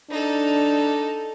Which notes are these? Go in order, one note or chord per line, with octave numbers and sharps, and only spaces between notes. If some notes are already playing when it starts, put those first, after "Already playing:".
D4 D#4 A4